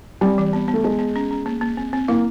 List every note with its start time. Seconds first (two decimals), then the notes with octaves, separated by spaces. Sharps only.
0.21 G3 C4
0.38 E3
0.53 B3
0.68 B3
0.74 A3
0.84 G#3 B3
0.99 B3
1.16 C#4
1.31 C#4
1.46 A#3
1.61 A#3
1.77 C4
1.93 C4
2.08 A#3 E4